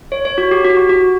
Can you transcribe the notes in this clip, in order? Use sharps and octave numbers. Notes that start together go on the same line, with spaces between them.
C#5
C#5
F#4
G4
F#4
F#4
F#4